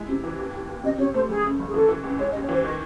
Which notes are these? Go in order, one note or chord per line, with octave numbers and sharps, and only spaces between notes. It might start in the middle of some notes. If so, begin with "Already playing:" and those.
Already playing: G#3 E4
C3
E3
D#2
D#2
D#2
C3 D#5
C3 C#5
A3 C5
F#1 G#4
C#3
F#1
G#4
E3 A4
E3
C#2
G#3 C#5
D#5
D#2
C#5
E3 C5
D#3 D#5